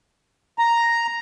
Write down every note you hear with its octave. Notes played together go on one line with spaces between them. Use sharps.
A#5